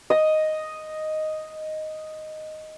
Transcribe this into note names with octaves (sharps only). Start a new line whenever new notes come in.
D#5 D#6